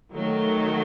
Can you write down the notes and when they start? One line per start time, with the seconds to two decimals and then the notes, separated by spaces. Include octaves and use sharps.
0.12 D#3 F#3 A3